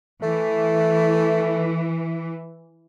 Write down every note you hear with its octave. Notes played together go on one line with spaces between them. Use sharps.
E3 A3